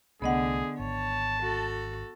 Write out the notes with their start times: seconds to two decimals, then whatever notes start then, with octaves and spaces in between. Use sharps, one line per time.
0.22 C2 D3 A3 B3 G#4 D#5 F#5
0.79 G#1 C#5 A5
1.42 F#4 A4